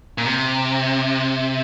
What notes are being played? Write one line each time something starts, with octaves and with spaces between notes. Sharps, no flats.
A#2
C3